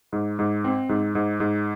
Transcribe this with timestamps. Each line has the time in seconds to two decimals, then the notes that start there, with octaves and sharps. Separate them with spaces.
0.13 G#2
0.39 G#2
0.64 C4
0.89 G#2
1.15 G#2
1.40 G#2